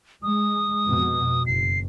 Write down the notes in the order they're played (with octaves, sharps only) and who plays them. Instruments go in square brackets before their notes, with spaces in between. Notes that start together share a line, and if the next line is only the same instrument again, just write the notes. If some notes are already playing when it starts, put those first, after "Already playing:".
[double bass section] G#3 [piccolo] D#6
[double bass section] F2 B2
[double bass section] F#1 [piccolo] C7